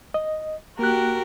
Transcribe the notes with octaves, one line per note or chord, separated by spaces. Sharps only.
D#5
A#3 F#4 G4 A#4 F#6